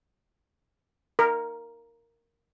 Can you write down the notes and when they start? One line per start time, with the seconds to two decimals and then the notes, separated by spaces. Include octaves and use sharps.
1.19 A#4